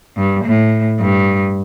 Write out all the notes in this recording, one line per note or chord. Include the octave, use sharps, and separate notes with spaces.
G2
A2
G2